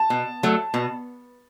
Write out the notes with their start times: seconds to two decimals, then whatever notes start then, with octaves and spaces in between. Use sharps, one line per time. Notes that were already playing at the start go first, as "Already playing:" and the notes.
Already playing: A5
0.10 B2
0.43 F#3 A3
0.74 B2